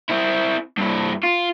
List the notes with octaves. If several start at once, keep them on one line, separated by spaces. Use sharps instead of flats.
C4 E4
G2 E4
F4